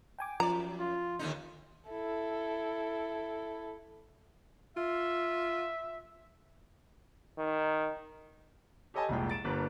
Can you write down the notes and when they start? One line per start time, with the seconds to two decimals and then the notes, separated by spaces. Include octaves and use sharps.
0.19 G5 G#5 D6
0.40 F#2 F3 D5 A#5
0.79 F4
1.19 D#2 D3 D#4
1.89 E4 A4
4.77 F4 E5
7.38 D#3
8.94 G4 A4 C#5 D#5 G#5 A5
9.09 F1 C2 A#2 G#3 G5
9.29 A6 D7 E7
9.44 G1 G2 A#3 B4